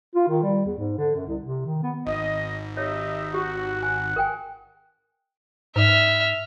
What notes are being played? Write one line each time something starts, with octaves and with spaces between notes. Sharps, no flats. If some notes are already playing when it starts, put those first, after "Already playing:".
F4
D#3
G3
E2
G#2
D3
F#2
C2
C3
D#3
B3
G#1 D#5
D#4 G4 C#5 D#5 E5
F#4 G4
F#5 G#5
A#4 G5 G#5
G#2 E5 F6